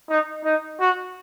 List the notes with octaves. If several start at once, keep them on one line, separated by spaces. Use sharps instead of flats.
D#4
D#4
F#4